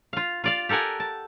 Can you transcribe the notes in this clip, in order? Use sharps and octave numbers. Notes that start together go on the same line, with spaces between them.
F4 F5
F4 D5 F5
G4 A4 A#4 F#5 G#5
A5